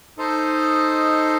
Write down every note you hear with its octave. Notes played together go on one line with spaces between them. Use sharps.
D#4 A4 C5 D#5